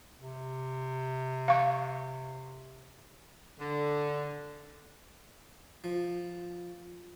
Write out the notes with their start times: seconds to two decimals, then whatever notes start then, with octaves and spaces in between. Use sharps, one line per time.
0.19 C3
1.48 F5 C#6
3.59 D3
5.84 F3